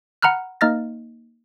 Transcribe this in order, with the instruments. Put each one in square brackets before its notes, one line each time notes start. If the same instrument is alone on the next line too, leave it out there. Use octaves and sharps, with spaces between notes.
[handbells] F#5 A#5 B5 F6 F#6
A#3 D#4 D#5 F6 A6 A#6